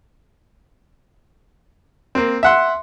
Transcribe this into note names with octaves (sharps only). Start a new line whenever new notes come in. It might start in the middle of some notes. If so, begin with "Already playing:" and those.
A#3 C4
E5 F#5 C6